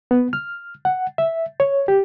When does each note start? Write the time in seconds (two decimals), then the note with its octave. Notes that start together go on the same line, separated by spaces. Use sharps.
0.11 B3
0.33 F6
0.85 F#5
1.18 E5
1.60 C#5
1.88 G4